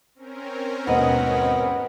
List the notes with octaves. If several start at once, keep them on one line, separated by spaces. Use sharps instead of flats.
C4 C#4 A#4
D#2 G#2 B2 D#3 B3 D#5